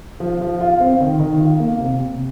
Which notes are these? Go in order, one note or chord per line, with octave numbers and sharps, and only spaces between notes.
F3
F3
F4
C4
D#3
D#3
F4
A#3
C3
C3